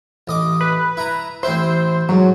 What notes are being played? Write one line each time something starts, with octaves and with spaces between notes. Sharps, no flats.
A1 D#5 D6
B4
E4 A#5
A1 C4 E4 C5
G#2 F#3